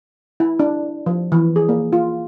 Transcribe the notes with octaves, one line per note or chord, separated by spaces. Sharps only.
E4
D4
F3
E3
G#4
A#3
F4